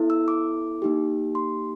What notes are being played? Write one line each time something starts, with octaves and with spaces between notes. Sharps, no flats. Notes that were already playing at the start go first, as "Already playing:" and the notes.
Already playing: B3 E4 A4
E6
D6
A#3 D#4 G4
C6